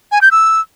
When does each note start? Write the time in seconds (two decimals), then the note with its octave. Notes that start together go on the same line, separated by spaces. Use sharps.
0.12 G#5
0.21 G6
0.31 E6